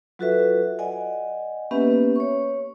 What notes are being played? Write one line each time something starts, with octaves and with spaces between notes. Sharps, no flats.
F#3 F4 F#4 A4 B4 E5
D5 D#5 F#5 G#5
A#3 B3 C#4 G4 B4 E5
C#5 C#6